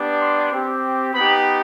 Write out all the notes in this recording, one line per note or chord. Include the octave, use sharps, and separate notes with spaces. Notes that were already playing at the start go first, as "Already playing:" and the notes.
Already playing: B3 D4 G4
C6
C4 G4
B3 D#4 G4 B5